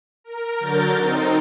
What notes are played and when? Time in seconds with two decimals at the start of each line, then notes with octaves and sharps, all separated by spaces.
0.24 A#4
0.60 D3 F#3 A#4 G6 A6
0.97 C4 D#4